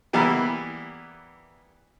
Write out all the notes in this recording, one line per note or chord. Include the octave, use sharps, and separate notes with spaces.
E3 G3 A#3 B3 E4